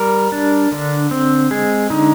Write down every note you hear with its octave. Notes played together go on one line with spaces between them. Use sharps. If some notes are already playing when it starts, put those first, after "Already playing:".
Already playing: G3 A#4
D4
D3
C4
G#3 G#4
D3 D#4